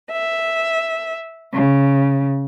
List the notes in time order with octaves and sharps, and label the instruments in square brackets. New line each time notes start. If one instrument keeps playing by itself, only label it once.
[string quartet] E5
C#3